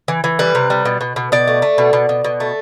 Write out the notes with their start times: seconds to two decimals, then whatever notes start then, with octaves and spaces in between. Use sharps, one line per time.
0.08 E3
0.24 E3
0.39 G3 B4
0.55 C3
0.70 G3
0.85 B2
1.01 B2
1.16 B2
1.32 B2 D5
1.47 A3
1.62 A3
1.78 B2
1.93 B2
2.09 B2
2.24 B2
2.40 A3